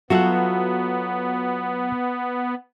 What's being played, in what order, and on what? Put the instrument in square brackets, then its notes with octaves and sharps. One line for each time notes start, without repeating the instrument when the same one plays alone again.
[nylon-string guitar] F#3 F4 A4 [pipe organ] B3 [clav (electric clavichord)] F#4 E5 F#5